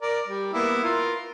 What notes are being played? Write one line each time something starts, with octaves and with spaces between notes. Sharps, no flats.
A#4 D5
G3
A#3 B3 E4
F4 A#4